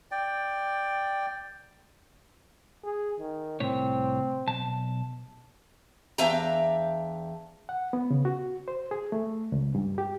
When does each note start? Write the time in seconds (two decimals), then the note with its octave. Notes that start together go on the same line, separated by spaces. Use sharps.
0.11 D5 G5
2.83 G#4
3.19 D#3
3.60 C2 A2 C4 C#5
4.47 B1 A5
6.18 E2 D4 E5 F5 G5 A#5
7.69 F#5
7.93 B3
8.11 C#3
8.25 F#4
8.68 C5
8.91 G#4
9.12 A3
9.52 C#2
9.75 G2
9.98 G4